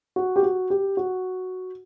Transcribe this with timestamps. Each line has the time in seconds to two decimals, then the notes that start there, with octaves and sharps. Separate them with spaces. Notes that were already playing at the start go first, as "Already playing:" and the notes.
0.16 F#4
0.36 G4
0.43 F#4
0.70 G4
0.97 F#4